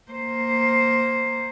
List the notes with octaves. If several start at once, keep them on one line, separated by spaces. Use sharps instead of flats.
A#3 C5